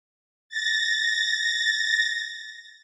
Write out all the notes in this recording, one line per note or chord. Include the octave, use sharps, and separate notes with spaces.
A6 A#6